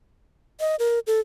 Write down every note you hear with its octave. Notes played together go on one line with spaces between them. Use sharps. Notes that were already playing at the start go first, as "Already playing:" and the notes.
D#5
A#4
A4